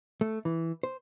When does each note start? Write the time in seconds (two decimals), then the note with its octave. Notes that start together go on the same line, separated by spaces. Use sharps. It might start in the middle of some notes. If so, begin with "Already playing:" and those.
0.21 A3
0.45 E3
0.83 C5